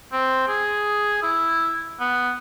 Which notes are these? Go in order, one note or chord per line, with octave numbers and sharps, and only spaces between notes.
C4
G#4
E4
B3